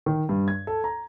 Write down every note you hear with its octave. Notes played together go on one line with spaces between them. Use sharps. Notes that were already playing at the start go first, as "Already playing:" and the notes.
D#3
G2
G#6
A4
A#5